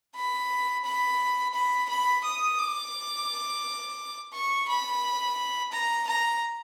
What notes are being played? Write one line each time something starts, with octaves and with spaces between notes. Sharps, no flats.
B5
B5
B5
B5
D#6
D6
C#6
B5
A#5
A#5